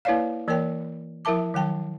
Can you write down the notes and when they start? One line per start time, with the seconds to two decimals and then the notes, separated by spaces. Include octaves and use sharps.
0.05 A#3 E4 B4 C#5 D5 F5
0.48 E3 A#3 A#4 C#5 G5
1.25 F3 E4 A#4 E5 A5 D6
1.54 D#3 F#3 G5 A5